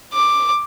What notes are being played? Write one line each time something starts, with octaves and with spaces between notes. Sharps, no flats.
D6